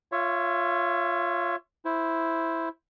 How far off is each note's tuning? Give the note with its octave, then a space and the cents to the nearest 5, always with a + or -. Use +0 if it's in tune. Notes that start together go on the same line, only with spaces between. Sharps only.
F4 +0 C#5 +0 E5 +30
E4 +0 C5 +0